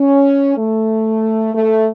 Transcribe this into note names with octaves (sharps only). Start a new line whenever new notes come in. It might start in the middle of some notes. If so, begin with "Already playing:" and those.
Already playing: C#4
A3
A3